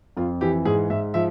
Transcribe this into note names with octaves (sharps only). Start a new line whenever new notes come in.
F2 F4
E3 G4
G#2 G#4
G#2 E5
F3 E5